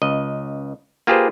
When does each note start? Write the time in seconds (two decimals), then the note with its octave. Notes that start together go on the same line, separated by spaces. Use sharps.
0.02 C#2 D#5
1.07 A#3 F4 G4 G#4 B4 C5